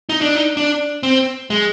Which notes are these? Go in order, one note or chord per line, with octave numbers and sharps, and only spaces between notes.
D#4
D4
D#4
D4
C4
G#3